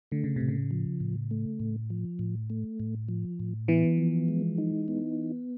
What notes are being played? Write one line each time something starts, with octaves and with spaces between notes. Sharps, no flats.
D3 A3
C#3
A2 C3
C#3
F3
A2
A3
A2
F3
A2
A3
A2
F3
A2
E3 B3
F3
G#3
D#4
B3